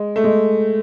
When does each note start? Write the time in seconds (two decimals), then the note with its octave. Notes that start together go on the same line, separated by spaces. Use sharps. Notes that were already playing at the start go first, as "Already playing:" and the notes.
Already playing: G#3
0.16 A3
0.24 G#3